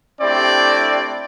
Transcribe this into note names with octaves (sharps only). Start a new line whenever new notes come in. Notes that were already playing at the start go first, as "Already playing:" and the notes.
A3 C4 D4 E4 G4 D5